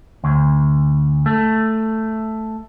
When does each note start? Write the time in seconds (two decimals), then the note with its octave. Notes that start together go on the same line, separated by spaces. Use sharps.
0.24 D2
1.26 A3